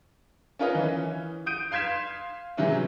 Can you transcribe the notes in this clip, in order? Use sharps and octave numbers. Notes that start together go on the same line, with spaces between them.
C#4 F4 A#4 B4 C#5 D#5
E3 C#4
D#6 G6 D7 D#7
F5 C6 G#6 B6 E7
G#2 C3 E3 F#3 C#4 E4